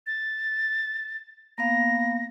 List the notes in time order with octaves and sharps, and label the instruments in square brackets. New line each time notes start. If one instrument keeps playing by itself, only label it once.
[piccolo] A6
[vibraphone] A#3 B3 F5 [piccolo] A#6